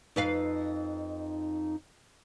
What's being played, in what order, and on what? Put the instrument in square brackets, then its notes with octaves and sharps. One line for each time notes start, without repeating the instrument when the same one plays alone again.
[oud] F2 B4 F5 [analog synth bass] D#4